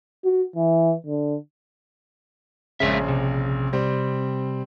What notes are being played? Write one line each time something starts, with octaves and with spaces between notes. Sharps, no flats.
F#4
E3
D3
A#1 C#3 G#3 A#3 E5
C3
G3 C4